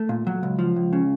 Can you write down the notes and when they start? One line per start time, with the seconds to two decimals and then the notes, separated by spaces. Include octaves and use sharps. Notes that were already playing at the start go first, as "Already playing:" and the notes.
Already playing: A3
0.09 A#2
0.27 F#3
0.43 C#2
0.59 F3
0.76 C#2
0.93 C#3